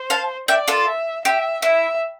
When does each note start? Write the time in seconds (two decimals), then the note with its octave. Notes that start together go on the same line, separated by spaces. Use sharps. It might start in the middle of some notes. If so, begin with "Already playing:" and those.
Already playing: C5
0.10 F5 A5
0.48 D5 E5 G5
0.68 F4 A4
0.87 E5
1.25 G4 E5
1.62 E4 E5